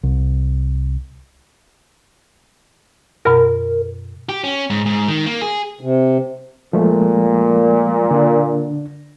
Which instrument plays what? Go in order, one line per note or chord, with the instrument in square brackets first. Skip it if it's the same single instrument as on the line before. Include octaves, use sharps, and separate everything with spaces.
[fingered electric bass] C2
[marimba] F#2 B2 [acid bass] A#4
[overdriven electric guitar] G4
C#4
G#2
G#2
D#3
A#3
G#4
[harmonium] C3
[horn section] A#2 [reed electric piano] F3 G#3 A3
[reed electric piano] D3 D4